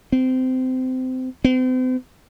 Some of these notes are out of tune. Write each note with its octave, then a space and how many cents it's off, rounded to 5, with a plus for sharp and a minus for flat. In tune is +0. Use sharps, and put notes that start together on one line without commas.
C4 -25
C4 -40